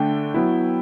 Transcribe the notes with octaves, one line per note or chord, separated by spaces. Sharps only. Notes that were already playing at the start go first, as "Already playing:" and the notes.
Already playing: D3 A3 D4 G5
F#3 B3 E4